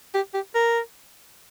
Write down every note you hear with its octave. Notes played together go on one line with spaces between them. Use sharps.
G4
G4
A#4